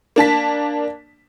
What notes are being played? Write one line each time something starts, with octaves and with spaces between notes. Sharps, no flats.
A#3 D4 A5 B6